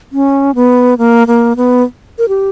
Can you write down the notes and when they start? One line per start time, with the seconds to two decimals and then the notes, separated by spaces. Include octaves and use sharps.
0.12 C#4
0.55 B3
0.98 A#3
1.27 A#3
1.57 B3
2.18 A#4
2.29 G4